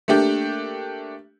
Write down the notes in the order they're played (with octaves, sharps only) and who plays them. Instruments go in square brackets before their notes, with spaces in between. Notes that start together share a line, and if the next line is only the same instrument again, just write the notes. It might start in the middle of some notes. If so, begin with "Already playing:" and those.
[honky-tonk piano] A3 A#3 D4 G4